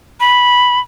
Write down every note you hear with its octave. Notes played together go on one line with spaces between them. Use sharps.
B5